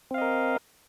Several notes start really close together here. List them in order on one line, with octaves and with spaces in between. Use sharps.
C4 F5 D#5 A#4